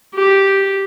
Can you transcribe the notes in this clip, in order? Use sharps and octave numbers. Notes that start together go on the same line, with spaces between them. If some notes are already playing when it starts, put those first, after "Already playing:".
G4